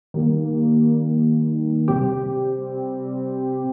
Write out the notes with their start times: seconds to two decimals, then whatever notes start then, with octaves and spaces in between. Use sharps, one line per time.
0.14 D#3 G3 A#3
1.88 C3 G3 C4 G4